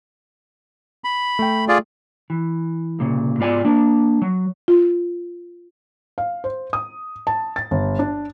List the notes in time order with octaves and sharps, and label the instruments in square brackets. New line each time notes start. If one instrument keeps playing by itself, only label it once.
[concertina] B5
[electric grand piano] A3 G5
[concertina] F4 G#4 D5
[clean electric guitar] E3
C2 A#2 C#3
G#2 B3 F4 D5 G#5
A#3 D4
F#3
[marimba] F4
[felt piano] F5
C5
D#6
A5
A6
G1
D4